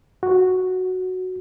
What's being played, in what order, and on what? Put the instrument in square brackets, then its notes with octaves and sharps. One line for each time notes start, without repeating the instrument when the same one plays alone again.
[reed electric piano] F#4